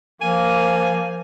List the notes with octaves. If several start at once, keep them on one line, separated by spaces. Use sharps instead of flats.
F3 A#3 G#5